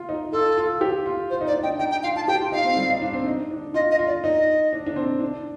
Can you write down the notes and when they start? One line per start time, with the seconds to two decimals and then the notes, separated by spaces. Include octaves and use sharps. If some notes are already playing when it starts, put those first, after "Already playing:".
Already playing: F4
0.09 D#4
0.32 F4 A4
0.58 F4
0.81 G4
1.06 F4
1.30 F4 C5
1.41 D#4
1.47 D5
1.53 D4
1.63 D#4 G5
1.79 D#4 G5
1.91 G5
2.03 F4 F5
2.16 A5
2.28 G4 G5
2.41 F4
2.52 D#4 F5
2.65 C4
2.77 G3
2.90 D#4
3.02 D4
3.13 C4
3.26 D#4
3.51 D4
3.74 F4 D#5
3.91 D#5
3.99 F4
4.07 D5
4.23 D#4 D#5
4.73 D4
4.86 D4
4.96 C4
5.21 D4